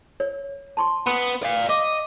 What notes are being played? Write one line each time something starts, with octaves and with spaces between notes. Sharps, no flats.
C#5
A5 C6 C#6
B3 B5 D#6
D5 F5
D#5 D6